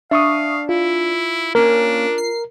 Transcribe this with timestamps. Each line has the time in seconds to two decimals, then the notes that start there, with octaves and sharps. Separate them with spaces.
0.11 D4 E5 F5 C#6 D#6
0.69 E4 F4
1.55 A#3 C#4 D4 A#4
2.18 C7